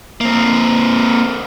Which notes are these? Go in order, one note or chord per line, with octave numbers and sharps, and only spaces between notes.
A#3 C4